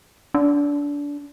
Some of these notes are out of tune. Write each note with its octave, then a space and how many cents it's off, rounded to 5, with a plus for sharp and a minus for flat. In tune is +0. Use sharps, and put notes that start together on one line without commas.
D4 -25